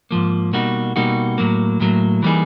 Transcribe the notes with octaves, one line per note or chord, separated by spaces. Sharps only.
G#2 F3 A#3
B2 G3 A#3 D#4 F#4
B2 G3 A#3 D#4 F#4
A2 F#3 A#3
A2 F#3 A#3
E3 G3 A#3 D#4 G#4